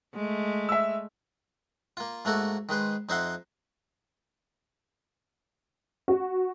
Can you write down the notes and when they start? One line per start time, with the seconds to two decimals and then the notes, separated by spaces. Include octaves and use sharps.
0.15 G#3 A3
0.69 E5 E6
1.97 A#3 F4
2.25 G#2 A3 A#3 F#4 A4 F#5
2.69 D#3 G#3 B4 C5
3.09 F2 D#4 C5 E5 F#5 C6
6.08 F#4